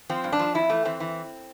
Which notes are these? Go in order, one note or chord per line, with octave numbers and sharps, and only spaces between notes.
F3 C4
G2
D4
F3
F2 E4
E3 A3
E3 C4
E3